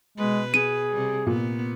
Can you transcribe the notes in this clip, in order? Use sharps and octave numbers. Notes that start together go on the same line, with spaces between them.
B2 G#3 B4
G#4 D#7
C3 G3
A#2 B3